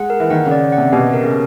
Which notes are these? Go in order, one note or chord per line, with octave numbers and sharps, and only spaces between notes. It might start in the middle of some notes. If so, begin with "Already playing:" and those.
Already playing: G#3 F#5
A#4
E3
D#3 F#5
C#3
D5
F#5
C3
B2 G4
A#4
C#3